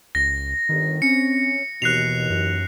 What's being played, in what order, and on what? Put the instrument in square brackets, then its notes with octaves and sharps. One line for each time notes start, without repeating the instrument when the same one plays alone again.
[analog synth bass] C#2 [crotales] A#6
[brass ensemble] G1 [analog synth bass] D#3
[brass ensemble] C4 [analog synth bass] C#4 [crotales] C#7
[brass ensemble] D#2 E3 [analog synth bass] B2 [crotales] F#6 C7 F7
[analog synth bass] F#2